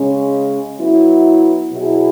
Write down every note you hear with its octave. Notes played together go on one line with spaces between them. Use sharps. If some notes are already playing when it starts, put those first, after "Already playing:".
Already playing: C#3 G#3 C#4
F#3 B3 E4
B2 F#3 E4 G#4